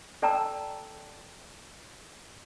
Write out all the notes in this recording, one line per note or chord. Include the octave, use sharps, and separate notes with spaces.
A4 D5 G5 A5 A#5 E6